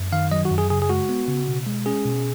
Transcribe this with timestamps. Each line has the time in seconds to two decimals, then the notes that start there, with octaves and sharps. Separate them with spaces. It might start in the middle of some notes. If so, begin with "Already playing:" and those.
Already playing: F#2
0.13 D#3 F5
0.31 F#3 D#5
0.45 F#4
0.51 F#2
0.58 G#4
0.70 C#3 G#4
0.82 G#4
0.89 G#3 F#4
1.09 B3
1.28 C#3
1.48 B2
1.67 G#3
1.86 C#4 G#4
2.05 B2